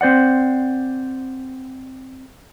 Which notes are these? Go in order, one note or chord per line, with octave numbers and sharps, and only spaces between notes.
C4 C5 D5 F#5